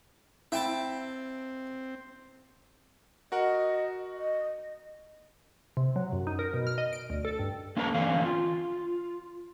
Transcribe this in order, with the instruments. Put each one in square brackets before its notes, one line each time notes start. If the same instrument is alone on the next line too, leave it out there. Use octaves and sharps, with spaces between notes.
[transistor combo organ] C4 [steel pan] E4 [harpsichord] E5 G5 A5
[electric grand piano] F#4 A#4 F#5 [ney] D#5
[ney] D#5
[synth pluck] C3
F#3
F#2
D#4
A#4
B2
F6
D#5
D7
D2
A4
G2
[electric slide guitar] A#3 C#4 A4 A#4 D5 A#5
D3 E3 A3 C4 C#4 F5
F4